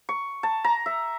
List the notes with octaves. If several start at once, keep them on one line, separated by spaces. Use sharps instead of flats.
C#6
A5
A#5
E5